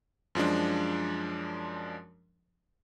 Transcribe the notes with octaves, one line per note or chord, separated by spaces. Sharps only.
F#2 F3 G#3 D4